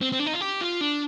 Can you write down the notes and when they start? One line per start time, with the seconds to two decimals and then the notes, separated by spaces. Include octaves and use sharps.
0.01 C4
0.12 C4
0.20 D4
0.26 D#4
0.33 F4
0.41 G4
0.61 F4
0.81 D4